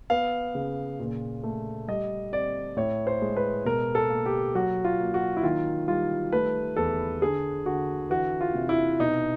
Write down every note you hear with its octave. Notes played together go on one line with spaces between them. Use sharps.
B3 F5
C#3
A#2
A3
G3 D#5
C4 D5
A2 C#5
C5
G#3
B4
B2 A#4
A4
A#3
G4
F#3 F#4
F4
A#3
F#4
E4
D#3 F4
G3 F4
A3 B4
E2 A4
D3 G#4
D3 F#4
E3 F#4
F4
C3
E4
B2 D#4